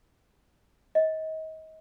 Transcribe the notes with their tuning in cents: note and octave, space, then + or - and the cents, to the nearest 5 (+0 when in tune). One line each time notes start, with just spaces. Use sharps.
D#5 +30